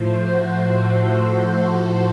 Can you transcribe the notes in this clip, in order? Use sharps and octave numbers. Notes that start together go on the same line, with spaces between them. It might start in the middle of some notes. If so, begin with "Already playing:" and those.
Already playing: A2 F3 A3 C5
F#4
A4
F#4